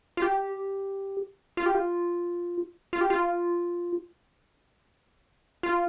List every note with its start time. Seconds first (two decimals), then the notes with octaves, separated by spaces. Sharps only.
0.17 F4
0.22 G4
1.57 F4
1.66 G4
1.75 F4
2.93 F4
3.01 G4
3.10 F4
5.63 F4